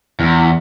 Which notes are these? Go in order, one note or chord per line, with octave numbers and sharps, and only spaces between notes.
E2